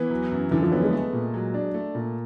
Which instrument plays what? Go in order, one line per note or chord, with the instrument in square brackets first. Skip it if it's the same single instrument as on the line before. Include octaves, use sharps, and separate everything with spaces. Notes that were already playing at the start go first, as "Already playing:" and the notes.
Already playing: [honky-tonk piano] E3 [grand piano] B3
[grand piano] F#3
F#2
[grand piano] D3 [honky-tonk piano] E3
[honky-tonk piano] F3
[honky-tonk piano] F#3 [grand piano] B3
[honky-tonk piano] G#3
[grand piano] A3
A#2
F#3
D4
A3
A#2